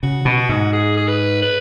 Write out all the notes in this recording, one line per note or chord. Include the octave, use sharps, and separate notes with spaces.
C#3 F#4
B2
F#4
G#2
G#4
G#4
B4
B4